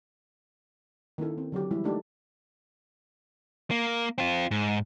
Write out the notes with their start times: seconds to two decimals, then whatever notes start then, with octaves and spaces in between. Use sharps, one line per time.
1.18 D#3 A#3 C#4 E4 A4
1.38 C4
1.52 D3 F#3 F#4 G4
1.71 E3 G3 G#3 E4
1.84 A3 A#3 D4 D#4 G4 A4
3.71 A#3
4.18 C4 F4
4.51 G#2